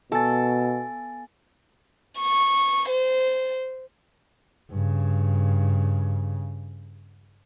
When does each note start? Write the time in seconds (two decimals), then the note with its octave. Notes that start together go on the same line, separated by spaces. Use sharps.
0.12 B2 B3 A4 G#5 A6
2.19 C#6
2.89 C5
4.71 G2 C#3